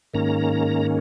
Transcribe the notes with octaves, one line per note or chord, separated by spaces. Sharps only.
G#2 D#3 A#3 C#4 A#5